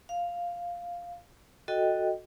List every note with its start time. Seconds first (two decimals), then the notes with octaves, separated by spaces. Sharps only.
0.09 F5
1.68 F#4 A4 D#5 G5